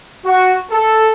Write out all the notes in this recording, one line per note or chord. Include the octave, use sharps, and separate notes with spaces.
F#4
A4